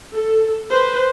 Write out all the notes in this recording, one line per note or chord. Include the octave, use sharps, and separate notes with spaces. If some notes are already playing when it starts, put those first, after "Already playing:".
A4
B4 C5